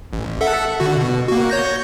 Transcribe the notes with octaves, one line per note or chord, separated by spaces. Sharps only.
A1
A4 E5 F#5
D3 F#4
B2
A#3 F#4
C#5 G6 A#6